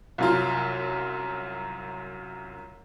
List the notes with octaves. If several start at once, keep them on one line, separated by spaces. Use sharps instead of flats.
C2 F#2 F4